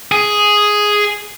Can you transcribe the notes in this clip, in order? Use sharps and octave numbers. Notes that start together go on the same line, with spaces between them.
G#4